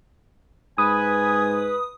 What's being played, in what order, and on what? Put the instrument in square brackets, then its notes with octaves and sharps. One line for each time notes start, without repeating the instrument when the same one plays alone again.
[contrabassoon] G#2 [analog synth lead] B4 [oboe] G#5 [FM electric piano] D#6